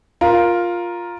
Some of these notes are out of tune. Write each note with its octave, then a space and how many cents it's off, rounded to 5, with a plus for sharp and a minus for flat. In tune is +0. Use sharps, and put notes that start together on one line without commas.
F4 +5 A#4 +10